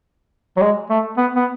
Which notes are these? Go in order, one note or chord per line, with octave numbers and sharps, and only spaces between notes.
F#3
G#3
A3
B3
B3